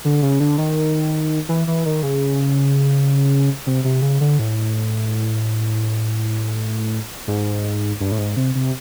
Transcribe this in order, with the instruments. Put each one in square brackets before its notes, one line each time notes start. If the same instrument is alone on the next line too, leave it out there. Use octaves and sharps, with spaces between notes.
[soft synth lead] D3
C#3
D3
D#3
E3
E3
D#3
C#3
C3
C3
C#3
D3
A2
G#2
G2
A2
G#2
C3
C3